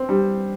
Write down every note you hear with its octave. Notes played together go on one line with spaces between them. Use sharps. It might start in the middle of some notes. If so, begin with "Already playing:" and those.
Already playing: C4
G3